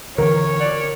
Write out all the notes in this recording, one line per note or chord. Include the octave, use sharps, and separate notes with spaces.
D3 E3 A#4 C#5
F#4 D5